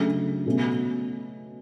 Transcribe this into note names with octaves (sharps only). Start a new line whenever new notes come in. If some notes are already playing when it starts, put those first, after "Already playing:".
Already playing: C#3 F#3 A3 D4
B2 A3 C#4